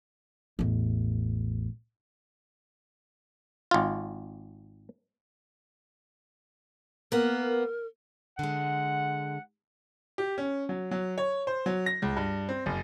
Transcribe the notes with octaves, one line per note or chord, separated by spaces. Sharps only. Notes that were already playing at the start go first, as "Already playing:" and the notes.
A1 E2
G#1 F4
A#3 B3 A#4
D3 G#3 F#5
G4
C#4
F#3
F#3
C#5
C5
F#3
A#6
C#2
G2
C4
F#1